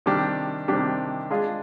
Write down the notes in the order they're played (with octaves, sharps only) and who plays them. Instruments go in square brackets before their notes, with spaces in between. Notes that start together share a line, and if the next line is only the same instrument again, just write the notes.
[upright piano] C3 D#3 G3 D4 G4
C3 D#3 G3 D4 G4
G#3 D4 F4 G#4